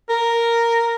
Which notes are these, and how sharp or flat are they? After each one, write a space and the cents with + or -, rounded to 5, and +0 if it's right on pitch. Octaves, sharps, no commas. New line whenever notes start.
A#4 -5